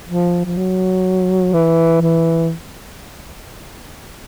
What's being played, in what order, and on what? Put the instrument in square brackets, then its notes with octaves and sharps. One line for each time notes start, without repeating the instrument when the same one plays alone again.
[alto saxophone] F3
F3
F#3
E3
E3